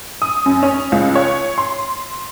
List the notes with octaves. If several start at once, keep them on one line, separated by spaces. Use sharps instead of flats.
D#6
F#2
C#4
C#2
C#5
C6